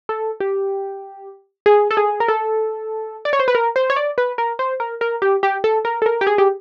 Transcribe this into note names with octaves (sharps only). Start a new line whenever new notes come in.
A4
G4
G#4
A4
G#4
A#4
A4
D5
C#5
C5
B4
A#4
C5
C#5
D5
B4
A#4
C5
A#4
A#4
G4
G4
A4
A#4
A4
A#4
G4
G#4
G4